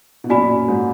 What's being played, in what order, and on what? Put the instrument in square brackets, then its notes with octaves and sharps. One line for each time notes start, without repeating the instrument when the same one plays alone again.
[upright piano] B2
[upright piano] F#2 A#2 [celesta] F#4 D5 G#5 B5
[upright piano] G#2